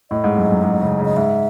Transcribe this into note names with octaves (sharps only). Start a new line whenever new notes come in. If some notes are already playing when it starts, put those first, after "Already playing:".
A2 D#5
G#2
F#2
F#2
G#2
C#3
C#3
D#5
G#2 E5